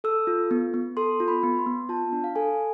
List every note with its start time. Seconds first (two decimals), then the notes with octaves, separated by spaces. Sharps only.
0.04 A4 E6
0.27 F4
0.51 B3
0.74 B3
0.97 A4 C6
1.20 F4
1.28 B5
1.43 B3
1.59 C6
1.66 B3
1.89 F4 A5
2.13 D4
2.24 F5
2.35 A4 G#5